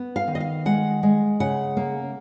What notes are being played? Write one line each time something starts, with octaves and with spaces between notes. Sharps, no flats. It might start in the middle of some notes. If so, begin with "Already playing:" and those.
Already playing: B3
F5
D#3
D#5
F5
G#3 F#5
G#3
C#3 F#5
A#3